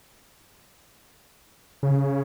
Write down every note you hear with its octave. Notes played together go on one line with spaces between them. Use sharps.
C#3